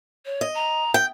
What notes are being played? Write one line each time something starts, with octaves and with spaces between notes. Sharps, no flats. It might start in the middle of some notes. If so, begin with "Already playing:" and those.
C#5
D#5
A#5
G5